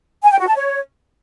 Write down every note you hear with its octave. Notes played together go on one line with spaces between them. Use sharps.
G#5
G5
F#4
A5
C#5